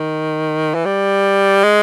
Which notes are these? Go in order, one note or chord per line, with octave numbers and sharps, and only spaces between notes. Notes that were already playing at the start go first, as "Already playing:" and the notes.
Already playing: D#3
E3
G3
G#3